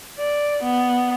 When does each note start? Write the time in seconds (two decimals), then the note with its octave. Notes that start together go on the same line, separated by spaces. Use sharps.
0.19 D5
0.63 B3